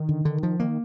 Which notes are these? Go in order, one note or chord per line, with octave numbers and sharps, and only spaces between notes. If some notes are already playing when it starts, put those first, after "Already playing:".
Already playing: D#3
D3
D3
F3
D#3 A#3